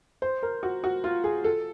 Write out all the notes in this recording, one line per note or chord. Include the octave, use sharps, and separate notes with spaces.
C5
A#4
F#4
F#4
F4
G#4
A4